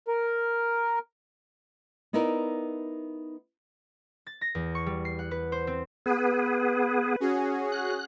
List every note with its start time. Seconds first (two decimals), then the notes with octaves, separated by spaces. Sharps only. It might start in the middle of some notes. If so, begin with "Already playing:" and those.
0.08 A#4
2.13 B3 D#4 E4 A#4 D5
4.27 A6
4.41 A#6
4.55 E2
4.75 C#6
4.86 G3
5.05 C7
5.19 F#5
5.31 B4
5.52 C5
5.67 C4
6.06 B3 G#4 B4
7.20 C#4 F#4 G#4
7.72 F#6